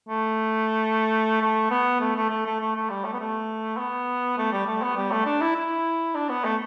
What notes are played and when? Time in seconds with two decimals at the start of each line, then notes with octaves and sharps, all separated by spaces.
0.09 A3
1.42 A3
1.71 B3
2.01 A3
2.16 A3
2.30 A3
2.45 A3
2.60 A3
2.75 A3
2.90 G3
3.04 A3
3.13 B3
3.20 A3
3.78 B3
4.38 A3
4.52 G3
4.66 A3
4.82 B3
4.96 G3
5.11 A3
5.26 D4
5.41 E4
5.56 E4
6.15 D4
6.29 B3
6.45 A3